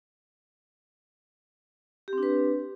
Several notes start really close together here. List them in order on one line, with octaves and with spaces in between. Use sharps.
G4 C4 D4 B4